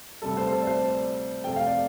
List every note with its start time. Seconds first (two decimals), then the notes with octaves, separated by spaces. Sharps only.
0.22 D2 C3 G3 A4
0.37 C5
0.47 C5
0.52 A4
0.62 D5
0.67 C5
0.82 D5
1.44 F2 C3 A3 G5
1.56 F5
1.67 D5